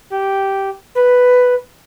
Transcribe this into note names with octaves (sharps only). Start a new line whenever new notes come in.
G4
B4